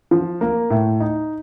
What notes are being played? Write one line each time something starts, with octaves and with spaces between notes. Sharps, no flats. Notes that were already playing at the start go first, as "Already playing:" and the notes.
F3
A#3
A2
D#4